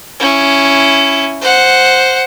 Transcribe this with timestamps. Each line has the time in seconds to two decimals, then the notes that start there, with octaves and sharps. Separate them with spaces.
0.20 C#4 E4
1.41 C5 F#5